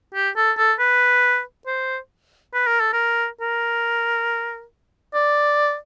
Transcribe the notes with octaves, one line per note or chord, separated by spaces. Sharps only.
G4
A4
A4
B4
C5
B4
A#4
A4
A#4
A#4
D5